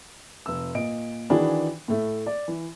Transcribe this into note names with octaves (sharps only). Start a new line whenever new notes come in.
F1 E6
A#2 D#5 D7
D#3 E3 D4 F#4 G#4 B4
A2 A3
D5
E3